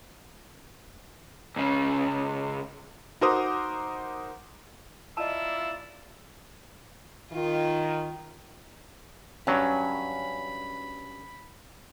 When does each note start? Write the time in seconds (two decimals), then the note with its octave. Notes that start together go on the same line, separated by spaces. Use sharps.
1.56 C#2 C#3
3.21 D#4 F#4 A#4 C5 D6 D#6
5.17 E4 F4 D5 D#5 A5 A#5 E6
7.32 D#3 F4
9.47 G2 F#3 C#4 B5